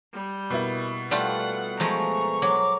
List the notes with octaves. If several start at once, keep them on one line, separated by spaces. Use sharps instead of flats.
G3
B2 A#3 E4
G3 A3 F4 F#5
F3 G#3 A3 A#5 C#6
F#3 D6